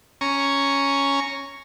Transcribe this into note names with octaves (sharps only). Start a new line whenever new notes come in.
C#4 G#5 A#5 C#6